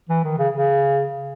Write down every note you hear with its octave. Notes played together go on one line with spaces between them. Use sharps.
E3
D#3
C#3
C#3